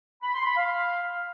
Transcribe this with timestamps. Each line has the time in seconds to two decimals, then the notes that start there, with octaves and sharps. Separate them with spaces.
0.22 B5
0.34 C6
0.45 B5
0.56 F5